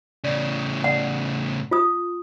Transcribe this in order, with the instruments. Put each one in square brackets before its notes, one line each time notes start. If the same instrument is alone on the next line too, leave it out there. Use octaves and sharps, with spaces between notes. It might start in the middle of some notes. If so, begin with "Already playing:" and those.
[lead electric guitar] A2 C#3 [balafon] D5
[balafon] D5 [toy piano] F#5
[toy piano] F4 D#6